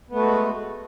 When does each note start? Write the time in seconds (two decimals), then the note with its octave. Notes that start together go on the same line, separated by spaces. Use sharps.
0.09 B3
0.12 A3
0.16 B4
0.19 F#4
0.22 G#3